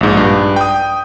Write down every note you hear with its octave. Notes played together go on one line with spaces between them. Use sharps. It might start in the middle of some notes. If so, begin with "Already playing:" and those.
A#1 G#2
G2
G5 D#6